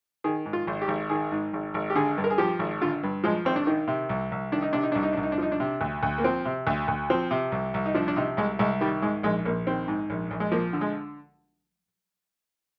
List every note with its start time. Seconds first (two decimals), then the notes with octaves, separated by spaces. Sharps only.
0.24 D#3 G#4
0.46 G#2
0.53 F4
0.67 G#1
0.82 G4
0.88 G#1
1.10 D#3 G#4
1.32 G#2
1.53 G#1
1.74 G#1
1.90 G4
1.95 D3 G#4
2.18 G2
2.24 A#4
2.30 G#4
2.38 F3 G4
2.59 G#1
2.81 D3 F4
3.03 G2
3.24 F3 G#3
3.45 G#1 C4
3.56 D4
3.66 D#3 D#4
3.88 C3
4.09 C2
4.32 C2
4.52 D#3 D4
4.62 D#4
4.73 C3 D4
4.83 D#4
4.92 C2 D4
5.03 D#4
5.13 C2 D4
5.23 D#4
5.32 D4
5.38 F3 D#4
5.52 D4
5.60 C3
5.81 D2
6.03 D2
6.18 A#3
6.24 F3 C4
6.45 C3
6.67 D2
6.88 D2
7.10 F3 C4
7.31 C3
7.52 C2
7.74 C2
7.86 D#4
7.94 F3 D4
8.08 D4
8.16 C3 D#4
8.37 C2 G#3
8.59 C2 G#3
8.81 D#3 G3
9.02 G#2 G#3
9.23 A#1 G#3
9.45 A#1 A#3
9.67 D#3 C4
9.88 G#2
10.10 A#1
10.31 A#1
10.40 G#3
10.52 F3 A#3
10.73 D3
10.81 G#3